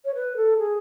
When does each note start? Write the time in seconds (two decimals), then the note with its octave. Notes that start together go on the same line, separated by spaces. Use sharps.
0.05 C#5
0.15 B4
0.37 A4
0.58 G#4